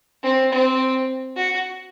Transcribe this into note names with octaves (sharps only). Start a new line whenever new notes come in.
C4
C4
F#4